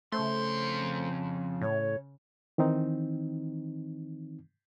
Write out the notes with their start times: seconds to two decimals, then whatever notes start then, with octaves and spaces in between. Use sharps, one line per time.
0.12 F2 C#3 A3 C5 C6
1.61 A2 C#5
2.58 D#3 E3 C4 D#4